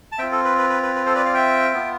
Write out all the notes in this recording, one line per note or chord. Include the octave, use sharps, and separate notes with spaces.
A5
C4 F4 E5 G5
A4
B4
B4
B4
B4
B4
A4 C5
B4 D5
D5 F5
E5 G5
B3 F4